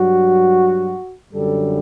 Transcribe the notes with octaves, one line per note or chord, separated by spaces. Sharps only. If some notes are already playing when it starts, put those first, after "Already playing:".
Already playing: G2 F#3 F#4
F#2 D3 G3 A4